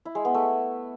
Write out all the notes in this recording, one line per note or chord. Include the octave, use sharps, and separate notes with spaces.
E4
G#3
B3
A3